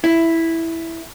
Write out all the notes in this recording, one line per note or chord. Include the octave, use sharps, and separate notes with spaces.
E4